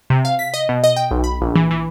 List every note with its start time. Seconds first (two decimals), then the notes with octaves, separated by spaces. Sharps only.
0.10 C3
0.25 F5
0.39 B6
0.54 D#5
0.69 B2
0.84 D#5
0.96 G5
1.11 B1
1.24 B5
1.42 A#1
1.56 E3
1.71 E3